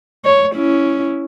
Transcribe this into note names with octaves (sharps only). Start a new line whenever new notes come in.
C#5
C#4 E4